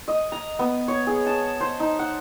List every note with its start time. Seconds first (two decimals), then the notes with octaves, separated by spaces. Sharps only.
0.08 D#5
0.32 A#5
0.59 B3
0.88 C#5
1.07 G#4
1.26 A5
1.61 C5
1.80 D#4
1.99 F#5